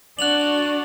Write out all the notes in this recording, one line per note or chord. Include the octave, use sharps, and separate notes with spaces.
D4 F#4 D5 F#6 F7 F#7